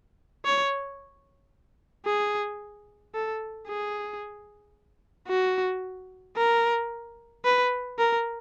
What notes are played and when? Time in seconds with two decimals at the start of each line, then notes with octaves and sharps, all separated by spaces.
0.45 C#5
2.06 G#4
3.14 A4
3.68 G#4
5.29 F#4
6.37 A#4
7.45 B4
7.99 A#4